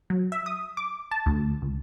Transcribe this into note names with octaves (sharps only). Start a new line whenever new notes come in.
F#3
E5
D#6
D6
A5
D2
C#2